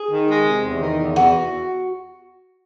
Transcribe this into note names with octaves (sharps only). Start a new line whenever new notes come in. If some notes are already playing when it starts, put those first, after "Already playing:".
Already playing: G#4
D#3
G#3
C3
E2
D#3
E2
E2 F#4